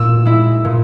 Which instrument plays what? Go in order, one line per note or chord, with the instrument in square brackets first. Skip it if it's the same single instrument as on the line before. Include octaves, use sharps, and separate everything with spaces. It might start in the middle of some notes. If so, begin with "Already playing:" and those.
Already playing: [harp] A#2 [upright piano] E6
[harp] G#3 E4
A#2